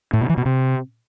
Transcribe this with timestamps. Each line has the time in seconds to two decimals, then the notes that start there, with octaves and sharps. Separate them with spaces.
0.13 A2
0.21 B2
0.29 E3
0.37 B2
0.46 C3